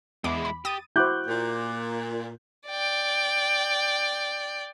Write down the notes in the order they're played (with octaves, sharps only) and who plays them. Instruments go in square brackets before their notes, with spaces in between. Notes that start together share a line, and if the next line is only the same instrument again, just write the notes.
[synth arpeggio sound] E2 D6 [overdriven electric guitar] G#3 E4
[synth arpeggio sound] B5
[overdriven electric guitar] G4 [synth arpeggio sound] D#6 A6 D#7
[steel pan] E4 F#4 C5 [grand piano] D6 F#6 G6
[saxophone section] A#2
[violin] D5 G5